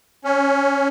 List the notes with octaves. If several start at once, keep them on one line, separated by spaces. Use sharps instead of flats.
C#4